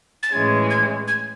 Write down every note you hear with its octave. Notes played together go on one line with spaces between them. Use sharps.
A6
A2 E3 G#3 C#4 G#6
G#6
G#6